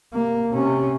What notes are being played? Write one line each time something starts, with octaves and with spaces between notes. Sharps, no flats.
C3 A#3
C3 C#4